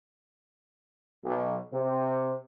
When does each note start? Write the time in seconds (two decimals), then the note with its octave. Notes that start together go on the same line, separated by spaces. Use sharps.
1.24 B1
1.73 C3